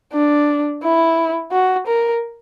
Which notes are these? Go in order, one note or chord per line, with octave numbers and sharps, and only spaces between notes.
D4
E4
F#4
A#4